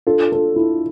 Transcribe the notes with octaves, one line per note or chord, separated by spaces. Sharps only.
D4 F4 A4
A4
E4